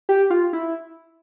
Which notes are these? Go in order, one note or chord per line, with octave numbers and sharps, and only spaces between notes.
G4
F4
E4